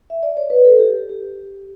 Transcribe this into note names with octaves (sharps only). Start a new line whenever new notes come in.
E5
D5
C#5
B4
A4
G4
G4